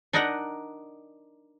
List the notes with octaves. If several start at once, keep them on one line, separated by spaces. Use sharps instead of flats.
D4 D#4 A#4 D#5 F#5 A#5